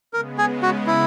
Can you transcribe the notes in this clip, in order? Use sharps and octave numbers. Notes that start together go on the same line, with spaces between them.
C#3 G#3 B3 A#4
G#4
F#4
E4